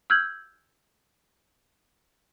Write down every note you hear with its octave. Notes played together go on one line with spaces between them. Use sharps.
E6 F6 G6 G#6 F#7